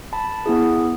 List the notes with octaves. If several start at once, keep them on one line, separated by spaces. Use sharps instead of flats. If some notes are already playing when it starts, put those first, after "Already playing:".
A5 B5
B3 E4 G#4